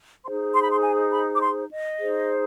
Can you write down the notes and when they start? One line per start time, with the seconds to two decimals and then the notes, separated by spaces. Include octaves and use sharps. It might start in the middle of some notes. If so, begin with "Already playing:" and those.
0.24 D#4 G#4 C5 C6
0.54 C6
0.62 B5
0.71 C6
0.82 G#5
1.12 B5
1.35 D6
1.41 C6
1.71 D#5
1.99 D#4 G#4 C5